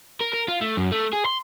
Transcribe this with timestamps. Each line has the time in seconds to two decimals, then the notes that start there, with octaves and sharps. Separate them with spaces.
0.20 A#4
0.33 A#4
0.48 F4
0.61 A3
0.77 F#2
0.92 A3
1.13 G#4
1.26 C6